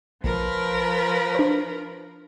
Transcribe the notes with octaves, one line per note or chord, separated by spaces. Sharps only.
A#1 F3 A#4 B4
D4 C5